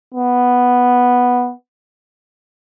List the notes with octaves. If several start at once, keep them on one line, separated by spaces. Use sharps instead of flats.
B3